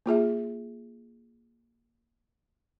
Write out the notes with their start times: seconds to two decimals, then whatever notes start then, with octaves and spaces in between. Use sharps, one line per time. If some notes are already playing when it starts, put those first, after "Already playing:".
0.06 A#3 F4 G#4 E5